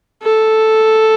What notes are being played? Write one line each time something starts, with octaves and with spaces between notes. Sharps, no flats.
A4